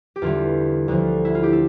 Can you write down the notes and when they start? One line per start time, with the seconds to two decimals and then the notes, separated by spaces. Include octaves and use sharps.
0.16 G4
0.22 E2 D3 G3 F4
0.88 D2 D3 F3
1.25 E4
1.35 F4
1.43 G4
1.53 A4